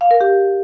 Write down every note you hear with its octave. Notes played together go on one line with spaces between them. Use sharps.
F5
A#4
G4